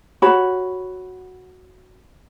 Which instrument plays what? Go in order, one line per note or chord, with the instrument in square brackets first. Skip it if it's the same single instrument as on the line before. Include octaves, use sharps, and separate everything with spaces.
[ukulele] F#4 C#5 B5